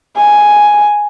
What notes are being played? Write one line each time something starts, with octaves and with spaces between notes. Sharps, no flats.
G#5